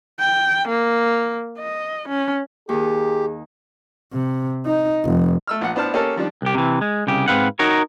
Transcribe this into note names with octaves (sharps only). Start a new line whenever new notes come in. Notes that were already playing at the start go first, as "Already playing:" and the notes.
G5
A#3
D#5
C#4
D#2 D#3 G4 G#4
C3
D#4
F1
A3 E6 F6
A#1 F#5
A2 B3 D4 C5 A5 F6
A#3 C#4 G4 A4 A#4 A5
D#3 F3 G3 D4
C2 G4
C3 E3
G#3
C2 C#3 G4
G#2 F#3 C4 B4 F5 F#5
D#4 F#4 A#4 C#5